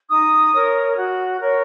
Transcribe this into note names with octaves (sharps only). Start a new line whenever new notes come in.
D#4 D#6
A#4 C#5
F#4
A#4 C#5